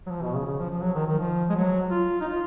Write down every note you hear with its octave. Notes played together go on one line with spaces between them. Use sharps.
F#3
F3
B2
C#3
C#3
F3
F3
F#3
D#3
D#3
F3
G#3
F#3
F4
D#4
F4